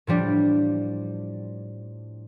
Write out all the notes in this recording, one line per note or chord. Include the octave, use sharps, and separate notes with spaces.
A2 F3 G3 D4